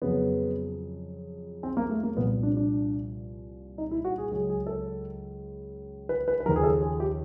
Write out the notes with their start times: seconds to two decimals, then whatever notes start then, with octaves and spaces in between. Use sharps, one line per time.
0.02 F2 C#3 F#3 B3
1.63 C4
1.77 A#3
1.89 A3
2.03 A#3
2.16 C2 A#2 F3 B3
2.43 D4
2.57 D4
3.78 D#4
3.91 E4
4.05 F#4
4.18 G#4
4.31 C#2 C#3 F#3 G#4
4.49 G#4
4.67 A4
6.09 B4
6.28 B4
6.40 B4
6.46 D#2 C#3 F3 A#4
6.56 G#4
6.64 A4
6.81 G#4
7.00 G4